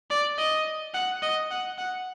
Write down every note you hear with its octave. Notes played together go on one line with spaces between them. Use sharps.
D5
D#5
F#5
D#5
F#5
F#5